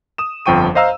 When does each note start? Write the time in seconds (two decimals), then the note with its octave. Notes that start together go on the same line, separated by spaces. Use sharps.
0.18 D#6 E7
0.46 G1 F2 F3 G5 C#6 D#7
0.75 C5 D#5 F5 A#5 E6